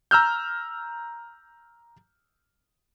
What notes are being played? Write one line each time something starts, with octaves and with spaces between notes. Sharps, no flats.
A#5 E6 F6 G6